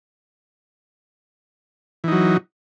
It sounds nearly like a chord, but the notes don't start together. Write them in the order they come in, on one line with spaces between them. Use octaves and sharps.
E3 D#4 F#3